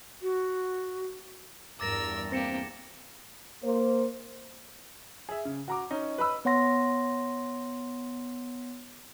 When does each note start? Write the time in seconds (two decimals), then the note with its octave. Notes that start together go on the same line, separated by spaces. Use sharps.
0.22 F#4
1.80 E2 G2 A#4 D6 E6 A6 A#6
2.32 A#3 C4 G4 A#6 C#7 E7
3.63 A#3 C5
5.29 G#4 E5
5.45 C#3
5.68 F#4 A#5 D6
5.91 C#4 D#4
6.18 B4 D#5 B5 E6
6.45 B3 C#5 F#5 C6 A#6